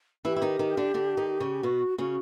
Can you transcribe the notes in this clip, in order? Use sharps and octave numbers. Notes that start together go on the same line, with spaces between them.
E3 E4 G4
E4
D#3 D#4
D#3 D#4
D3 D4
D3 D4
D#3 D#4
C#3 C#4
B2 B3 F#4
C#3 C#4 F#4